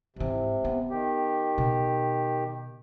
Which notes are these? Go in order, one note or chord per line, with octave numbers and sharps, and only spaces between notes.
G#2 C3 E3
B3
D#3 G4
B2